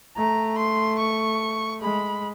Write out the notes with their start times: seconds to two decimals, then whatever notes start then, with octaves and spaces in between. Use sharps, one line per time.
0.17 A3 A#5
0.58 C6
0.99 C#6
1.81 G#3 B5